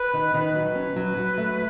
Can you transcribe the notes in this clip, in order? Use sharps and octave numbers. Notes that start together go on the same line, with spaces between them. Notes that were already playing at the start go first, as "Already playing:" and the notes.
Already playing: B4
D#3
D#3 B4
F#3
C#4
F#3
F#3
A3